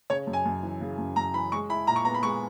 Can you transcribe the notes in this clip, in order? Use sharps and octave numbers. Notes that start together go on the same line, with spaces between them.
C#3 C#5
F#2
G#5
F#2
E3
C#3
F#2
F#2 A#5
E3 B5
G#3 C#6
E4 B5
A#2 A#5
C#6
B3 A#5
B5
G#3 C#6